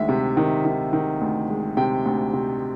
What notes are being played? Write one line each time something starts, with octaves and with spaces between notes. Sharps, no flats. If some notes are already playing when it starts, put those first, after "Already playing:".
Already playing: D2 D#3 G#3 E5
C3
D#3
D#3
D#3
D2
G#3
C3 G5
D2
C3